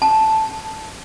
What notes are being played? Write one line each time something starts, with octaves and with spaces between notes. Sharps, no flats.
A5